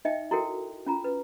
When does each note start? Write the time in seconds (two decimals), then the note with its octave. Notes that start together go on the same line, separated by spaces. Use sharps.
0.05 D#4 D#5 E5 G5
0.31 E4 F#4 A4 A#4 G5
0.86 C#4 F4 A#5
1.04 B4